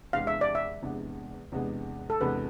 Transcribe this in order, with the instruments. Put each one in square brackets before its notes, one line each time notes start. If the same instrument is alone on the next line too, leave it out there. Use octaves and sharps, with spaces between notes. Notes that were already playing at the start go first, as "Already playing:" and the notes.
[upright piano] E2 C3 G#3 B3 D4 [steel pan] F5
[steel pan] E5
D5
E5
[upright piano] E2 C3 G#3 B3 D4
E2 C3 G#3 B3 D4
[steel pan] A4
[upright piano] E2 C3 G#3 B3 D4 [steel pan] B4